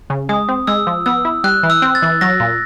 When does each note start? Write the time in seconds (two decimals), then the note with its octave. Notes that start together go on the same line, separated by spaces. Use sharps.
0.10 C#3
0.29 G#3 D#6
0.49 C4
0.67 G#3 E6
0.87 F3
1.06 B3 E6
1.25 E4
1.44 G3 F#6
1.63 E3
1.70 E6
1.82 C4
1.95 A6
2.02 E3
2.21 F#3 A#6
2.40 A#2